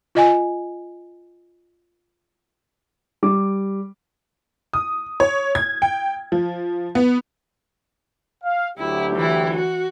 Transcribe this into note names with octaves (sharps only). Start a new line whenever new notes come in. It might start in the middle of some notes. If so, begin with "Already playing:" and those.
F4 D#5 G#5
G3 D6
D#6
C#5
G#6
G5
F3
B3
F5
D2 F#3 E4 G4
E3 E4
F#4